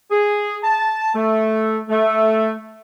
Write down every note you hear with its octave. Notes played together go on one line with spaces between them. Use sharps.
G#4
A5
A3
A3